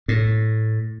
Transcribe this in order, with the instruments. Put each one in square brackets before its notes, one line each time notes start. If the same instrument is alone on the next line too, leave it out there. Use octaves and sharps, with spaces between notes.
[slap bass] A2